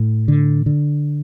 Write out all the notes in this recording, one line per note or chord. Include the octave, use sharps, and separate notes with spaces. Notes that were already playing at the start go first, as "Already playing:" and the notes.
Already playing: A2
D3
D3